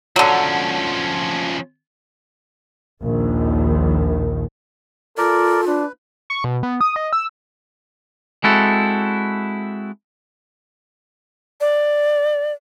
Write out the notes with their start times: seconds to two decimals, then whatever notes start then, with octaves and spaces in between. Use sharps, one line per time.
0.16 D3 F3 F#3 C#4
3.02 A#1 D#2 D#3
5.18 F4 A4 A#4 D5
5.67 D4 B4
6.30 C#6
6.44 B2
6.63 B3
6.81 D#6
6.96 D#5
7.13 E6
8.44 G#3 C4 E4 F#4 A4
11.61 D5